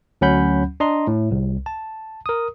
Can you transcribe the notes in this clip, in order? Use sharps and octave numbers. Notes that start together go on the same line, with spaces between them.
D2 F#3 C#4 F#5 B5 G6
D4 D#5 A#5 C6
A2
C2
A5
A#4 D#6